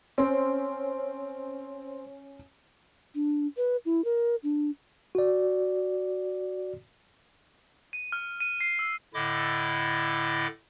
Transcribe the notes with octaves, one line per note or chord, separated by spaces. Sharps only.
C4 C#4
D4
B4
E4
A#4
D4
F#4 D5
D#7
F6
D#7
C7
E6
A2 D3 E4 D#5 D6